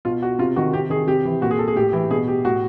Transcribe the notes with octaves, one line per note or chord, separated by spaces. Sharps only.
B2 F4
F#4
C3 F4
D#3 F#4
C3 G4
D#3 G#4
C3 G4
E3
A#2 F#4
G#4
A4
G#4
A2 G4
E3
B2 G#4
G4
A2 F#4